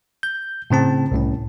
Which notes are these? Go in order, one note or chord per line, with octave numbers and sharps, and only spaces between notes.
G6
A2 C#3 C4 A5
C2 A2 C#4